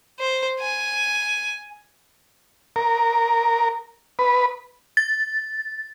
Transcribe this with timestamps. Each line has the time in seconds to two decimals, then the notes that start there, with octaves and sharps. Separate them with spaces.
0.20 C5
0.60 G#5
2.76 A#4
4.19 B4
4.97 A6